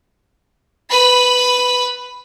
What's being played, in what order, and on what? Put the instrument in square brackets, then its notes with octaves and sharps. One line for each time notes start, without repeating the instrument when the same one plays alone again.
[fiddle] B4 B5